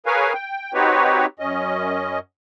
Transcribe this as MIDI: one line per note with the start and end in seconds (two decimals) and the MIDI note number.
0.06 0.33 68
0.06 0.33 70
0.06 0.33 71
0.06 0.33 73
0.06 0.33 77
0.06 0.33 80
0.34 0.73 79
0.74 1.26 60
0.74 1.26 63
0.74 1.26 66
0.74 1.26 67
0.74 1.26 71
0.74 1.26 73
1.39 2.19 42
1.39 2.19 61
1.39 2.19 75